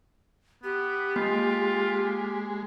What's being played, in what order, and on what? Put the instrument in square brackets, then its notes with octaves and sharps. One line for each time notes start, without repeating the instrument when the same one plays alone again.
[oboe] B3 [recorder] G4
[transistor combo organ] G#3 [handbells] A#3 [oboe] F4